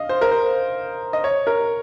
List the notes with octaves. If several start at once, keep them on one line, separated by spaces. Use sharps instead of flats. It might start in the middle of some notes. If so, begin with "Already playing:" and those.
Already playing: D#5 F5
C5
A#4
C5
D#5
C#5
A#4